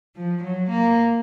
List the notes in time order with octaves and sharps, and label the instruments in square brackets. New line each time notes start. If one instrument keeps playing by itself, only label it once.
[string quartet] F3
F#3
A#3